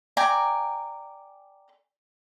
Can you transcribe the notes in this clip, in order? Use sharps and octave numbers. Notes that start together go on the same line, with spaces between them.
D5 G5 G#5 A#5